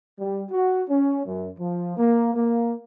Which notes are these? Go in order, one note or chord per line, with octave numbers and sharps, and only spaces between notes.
G3
F#4
C#4
F#2
F3
A#3
A#3